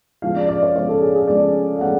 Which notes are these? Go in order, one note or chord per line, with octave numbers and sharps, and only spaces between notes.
C#3 F3 G#3 B3 F5
D5
D5
C#5
C#3 F3 G#3 B3 C#5
A4
G#4
G#4
C#3 F3 G#3 B3 D5
F5
C#3 F3 G#3 B3 F#5